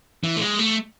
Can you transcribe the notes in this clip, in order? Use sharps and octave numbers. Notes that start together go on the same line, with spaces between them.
E3
A3
G#3
A3